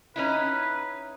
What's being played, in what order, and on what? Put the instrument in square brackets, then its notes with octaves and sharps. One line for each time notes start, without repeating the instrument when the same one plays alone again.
[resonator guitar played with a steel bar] C#4 D#4 E4 [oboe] B4